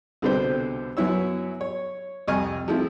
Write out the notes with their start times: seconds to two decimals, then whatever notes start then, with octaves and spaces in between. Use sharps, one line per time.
0.22 C2 B2 D3 C4 B4 C5
0.97 F#2 F#3 B3 E4 C#5 E6
1.61 C#5
2.28 C2 F2 D#5 G#5 C#6 F6
2.68 F3 G#3 A3 C4 E4